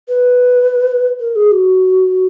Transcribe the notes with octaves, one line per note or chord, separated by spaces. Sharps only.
B4
A#4
G#4
F#4